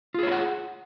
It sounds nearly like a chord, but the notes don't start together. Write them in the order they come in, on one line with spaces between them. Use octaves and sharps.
F4 G#4 C#5 E4 F#5